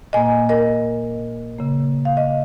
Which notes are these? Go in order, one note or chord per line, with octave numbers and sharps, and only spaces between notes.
A#2 A#3 D#5 G#5
A#4 D#5
C#3 A#3
F5
D#5